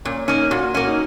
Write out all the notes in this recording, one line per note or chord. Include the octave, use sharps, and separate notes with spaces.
A#2 C#4
A#3 C#4 D#4
A#2 F#4
A#3 C#4 F#4
D#4